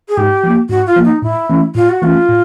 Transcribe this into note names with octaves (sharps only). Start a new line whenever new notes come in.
G#4
G#2 G4
F3 A#3
G#2 F#4
F4
F3 A#3
D#4
A2 E4
E3 A3 C#4
A2 F4
F#4
E3 A3 C#4 F4
A2